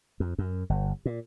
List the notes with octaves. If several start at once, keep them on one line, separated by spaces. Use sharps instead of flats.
F2
F#2
G1
A#2